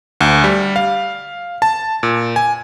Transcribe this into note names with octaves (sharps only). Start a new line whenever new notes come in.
D2
G3
F5
A5
A#2
G#5